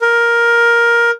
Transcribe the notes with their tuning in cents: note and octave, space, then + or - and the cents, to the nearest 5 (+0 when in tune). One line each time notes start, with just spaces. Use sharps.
A#4 +10